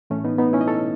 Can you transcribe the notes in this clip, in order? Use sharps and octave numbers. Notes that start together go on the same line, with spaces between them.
A2 E3 A3 C#4
B3 D#4
B3 D#4
C#4 E4
D#5
A4 C#5